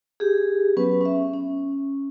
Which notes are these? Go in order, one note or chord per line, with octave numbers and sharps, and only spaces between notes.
G4 G#4
F#3 B3 C#4 B4
C#4 E5
C#4